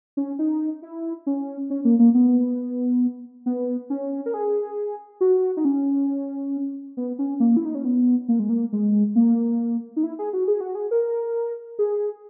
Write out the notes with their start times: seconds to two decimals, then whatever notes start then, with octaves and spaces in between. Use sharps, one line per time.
0.17 C#4
0.39 D#4
0.82 E4
1.27 C#4
1.70 C#4
1.85 A#3
1.99 A#3
2.14 B3
3.46 B3
3.90 C#4
4.26 A#4
4.34 G#4
5.21 F#4
5.57 D#4
5.65 C#4
6.97 B3
7.19 C#4
7.40 A#3
7.57 E4
7.65 D#4
7.75 C#4
7.85 B3
8.28 A#3
8.39 G#3
8.49 A#3
8.73 G#3
9.16 A#3
9.96 D#4
10.03 E4
10.19 G#4
10.33 F#4
10.48 G#4
10.61 F#4
10.75 G#4
10.91 A#4
11.79 G#4